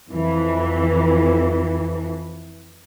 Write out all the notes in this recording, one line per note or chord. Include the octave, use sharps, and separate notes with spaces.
F2 E3